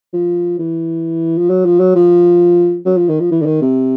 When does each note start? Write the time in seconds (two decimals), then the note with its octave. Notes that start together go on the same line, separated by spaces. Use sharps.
0.13 F3
0.59 E3
1.38 F3
1.50 F#3
1.65 F3
1.80 F#3
1.95 F3
2.86 F#3
2.97 F3
3.09 D#3
3.20 F3
3.32 E3
3.41 D3
3.46 D#3
3.62 C3